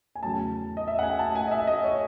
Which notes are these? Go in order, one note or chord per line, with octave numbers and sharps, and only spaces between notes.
G#5
E2 C#3 F#3 A3 A5
D#5
E5
F#5
G#5
A5
G#5
D#5
E5
D#5
C#5